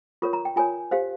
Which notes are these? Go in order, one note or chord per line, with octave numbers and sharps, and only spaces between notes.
F4 A#4 C#5 C#6
A#5
G5
F4 A#4 C#5 G#5
G4 C5 F5